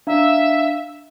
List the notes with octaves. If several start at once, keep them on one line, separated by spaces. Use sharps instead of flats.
D4 E5 F5 A#5